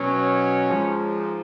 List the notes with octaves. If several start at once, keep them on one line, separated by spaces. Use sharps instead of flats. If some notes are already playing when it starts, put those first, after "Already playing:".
Already playing: B2 F#3 C#4
G#2 F3